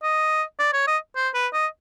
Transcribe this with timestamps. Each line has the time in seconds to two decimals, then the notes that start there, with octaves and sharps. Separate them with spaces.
0.03 D#5
0.59 D5
0.73 C#5
0.88 D#5
1.16 C5
1.34 B4
1.53 D#5